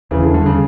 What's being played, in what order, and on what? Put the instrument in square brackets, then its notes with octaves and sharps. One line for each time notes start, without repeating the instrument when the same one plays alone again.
[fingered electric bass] E2 [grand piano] C#3 E3
[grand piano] D3
[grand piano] D3 [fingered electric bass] G3
[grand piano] C#3